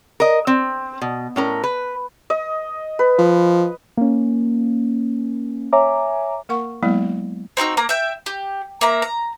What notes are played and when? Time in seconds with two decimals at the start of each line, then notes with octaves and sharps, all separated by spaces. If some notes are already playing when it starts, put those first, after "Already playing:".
0.20 A#4 D#5
0.47 C4
1.02 B2
1.36 A2 C#4 A#4
1.64 B4
2.30 D#5
2.99 B4
3.19 F3
3.97 A#3 C#4
5.73 C#5 E5 G#5 A#5 D6
6.49 A#3 A#4 F#5 C#6
6.83 F#3 G#3 A#3 B3 E4
7.57 C4 D#4 F#4 E6
7.77 A#3 A#5
7.89 E5 G5
8.26 G4
8.81 A#3 E5 A#5
9.02 A#5